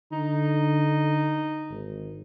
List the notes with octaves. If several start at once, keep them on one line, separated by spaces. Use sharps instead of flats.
D3 D#4
G#1